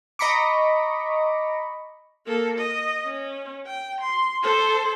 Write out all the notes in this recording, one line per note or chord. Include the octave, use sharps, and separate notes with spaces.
D#5 A#5 B5 C#6 D6
A#3 A4
D#5
C#4
G5
C6
A4 C5